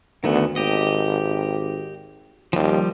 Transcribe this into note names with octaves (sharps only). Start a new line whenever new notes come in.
D2 D#3 A3 B3
G#1 G4 D#5
D#2 F3 G3